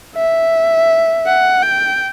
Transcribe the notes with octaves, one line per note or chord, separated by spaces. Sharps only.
E5
F#5
G5